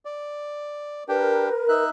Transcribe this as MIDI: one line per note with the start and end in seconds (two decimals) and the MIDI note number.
0.05 1.04 74
1.09 1.49 62
1.09 1.49 67
1.09 1.81 70
1.09 1.81 71
1.09 1.49 79
1.69 1.90 63
1.69 1.90 76
1.69 1.90 90